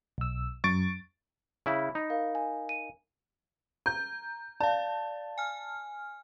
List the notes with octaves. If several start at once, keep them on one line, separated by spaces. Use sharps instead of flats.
B1 E6
F#2 C#6 A6 D7
C#3 E4 B5
D#4
A#4 F5
G#5
D#7
A#5 G6
D5 F5 A5
G#5 F6